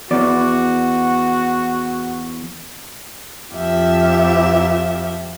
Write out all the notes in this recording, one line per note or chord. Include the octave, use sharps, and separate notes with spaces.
E2 F#4 D5
F2 F3 G4 E5